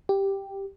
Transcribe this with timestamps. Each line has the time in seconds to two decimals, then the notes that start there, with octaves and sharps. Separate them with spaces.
0.09 G4